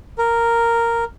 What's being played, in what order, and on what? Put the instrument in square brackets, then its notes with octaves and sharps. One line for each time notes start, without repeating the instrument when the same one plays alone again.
[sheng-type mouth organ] A#4